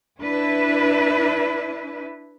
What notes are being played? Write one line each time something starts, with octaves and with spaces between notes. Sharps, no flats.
D4 E4 B4